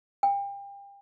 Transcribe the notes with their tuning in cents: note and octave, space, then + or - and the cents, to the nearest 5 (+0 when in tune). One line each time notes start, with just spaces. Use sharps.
G5 +30